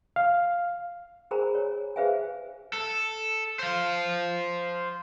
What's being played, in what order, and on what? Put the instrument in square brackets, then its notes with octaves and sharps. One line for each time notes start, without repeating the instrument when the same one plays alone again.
[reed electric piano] F5
[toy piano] G#4 A#4 C5 G#5 A#5 B5
C#5
G#4 B4 C5 E5 F5 G#5
[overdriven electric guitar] A4
C5 F5